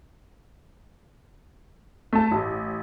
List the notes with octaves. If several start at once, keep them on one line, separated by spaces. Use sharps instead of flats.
A3 A5
A1